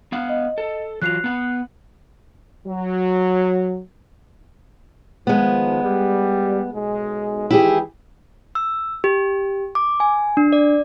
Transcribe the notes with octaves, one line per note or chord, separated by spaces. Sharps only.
B3 F5 F#5
D#5
A4
E3 F#3 F4 F#6 C7 F7
B3 F#5
F#3
D#3 F3 G#3 B3
G3
B1 G#3
D#3 E3 G#3 E4 G4 G#4
E6
G4
D6
G#5
D4
D5